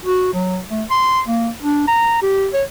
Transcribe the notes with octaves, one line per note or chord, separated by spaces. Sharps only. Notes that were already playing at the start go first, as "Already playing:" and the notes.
F#4
F#3
A3
C6
A#3
D4
A#5
G4
C#5